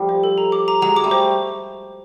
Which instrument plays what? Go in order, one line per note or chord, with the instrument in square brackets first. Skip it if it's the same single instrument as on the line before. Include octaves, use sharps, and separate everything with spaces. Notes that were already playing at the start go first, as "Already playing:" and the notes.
Already playing: [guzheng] F3 G3 A3
[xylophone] C5
A4
A#5
D6
A#5
[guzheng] F#3 G#3 [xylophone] A#5
[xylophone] D6
[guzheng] G3 A3
[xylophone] C5